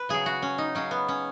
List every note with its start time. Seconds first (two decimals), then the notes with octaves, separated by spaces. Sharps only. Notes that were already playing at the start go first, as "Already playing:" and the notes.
Already playing: B4
0.09 C#3 F#3 G#4
0.26 F#4
0.42 C#4
0.58 D#4
0.75 C#3 F#3 C#4
0.91 B3
1.08 C#4